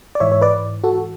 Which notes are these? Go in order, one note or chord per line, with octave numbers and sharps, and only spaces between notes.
D5
G#2 E3 C#5 E5
C#5
B4 D5
F#4 A4